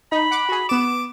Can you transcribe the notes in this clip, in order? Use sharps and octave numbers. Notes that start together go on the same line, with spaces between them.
D#4 B5
F#5 D6
F#4 G#4
B3 D6 E7